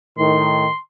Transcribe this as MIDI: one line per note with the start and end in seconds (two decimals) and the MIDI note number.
0.18 0.67 45
0.18 0.67 51
0.18 0.78 84